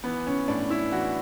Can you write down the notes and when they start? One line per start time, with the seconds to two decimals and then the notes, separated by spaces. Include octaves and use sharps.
0.04 E3 B3
0.27 C#4
0.48 A2 D4
0.70 E4
0.92 E3 F#4